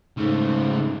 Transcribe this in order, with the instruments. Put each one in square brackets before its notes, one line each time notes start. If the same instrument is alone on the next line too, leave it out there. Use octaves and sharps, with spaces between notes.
[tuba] G#2 [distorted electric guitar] C#3 A3